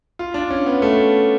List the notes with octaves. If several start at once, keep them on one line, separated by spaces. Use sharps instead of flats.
F4
D4
C#4
B3
A3